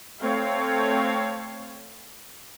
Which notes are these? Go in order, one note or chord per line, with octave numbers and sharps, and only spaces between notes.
A3 C4 C#5 F5